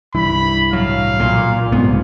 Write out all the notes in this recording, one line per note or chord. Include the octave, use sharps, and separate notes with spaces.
C2 G2 E3 B5
A2 F#3 F5
B1 A#2
F#1 C2 G#2 B3